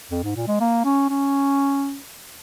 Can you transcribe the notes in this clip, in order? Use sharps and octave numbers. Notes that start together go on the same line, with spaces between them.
F2
G#2
A#2
G#3
A#3
C#4
C#4